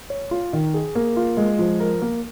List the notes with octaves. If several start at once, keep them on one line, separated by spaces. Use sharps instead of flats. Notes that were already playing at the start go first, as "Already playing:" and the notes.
C#5
F4
D#3
G#4
A#3
F4
G#3
F3
A#4
A#3